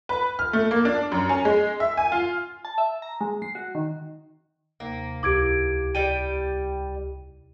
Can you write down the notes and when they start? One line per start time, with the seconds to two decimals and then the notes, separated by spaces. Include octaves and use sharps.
0.09 B4
0.39 F6
0.53 A3
0.71 A#3
0.85 D4
1.12 F#2
1.29 C#4
1.45 G#3
1.80 E5
1.97 G#5
2.12 F4
2.65 A5
2.78 E5
3.02 A#5
3.21 G#3
3.42 C7
3.55 F#4
3.75 D#3
4.80 D#2 C3 A#3
5.23 C#2 E4 G4 D6 G#6 D7
5.95 G3 D5 G5 D#7